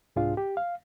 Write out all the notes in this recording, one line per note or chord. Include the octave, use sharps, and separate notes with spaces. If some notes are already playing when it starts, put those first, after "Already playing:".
C2 G#2 D4 F4 G#4 F5
G4
F5